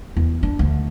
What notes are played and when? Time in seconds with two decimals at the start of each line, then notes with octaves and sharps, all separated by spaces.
0.17 E2
0.43 D4
0.59 D2